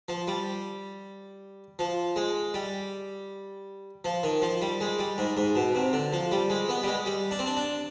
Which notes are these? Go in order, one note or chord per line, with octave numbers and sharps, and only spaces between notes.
F3
G3
F3
G#3
G3
F3
D#3
F3
G3
G#3
G3
G#2
G#2
B2
C3
D3
F3
G3
G#3
B3
G3
G#3
G3
D4
C4
D4
D4